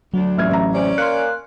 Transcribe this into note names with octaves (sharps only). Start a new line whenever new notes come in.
D2 F#3 D4
A1 E4 F6 G#6
A1 A#5
C3 C#4 D5
A#3 C6 F6 F#6 C#7